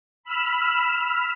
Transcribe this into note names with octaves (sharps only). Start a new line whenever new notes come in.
B5 E6 F6